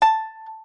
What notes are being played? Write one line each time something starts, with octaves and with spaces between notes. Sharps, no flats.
A5